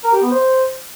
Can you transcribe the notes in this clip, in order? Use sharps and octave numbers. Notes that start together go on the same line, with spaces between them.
A#4
G4
B3
C5